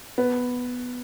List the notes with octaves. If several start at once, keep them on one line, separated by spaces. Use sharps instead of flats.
B3